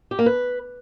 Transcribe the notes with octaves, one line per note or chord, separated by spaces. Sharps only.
G4
A#3
B4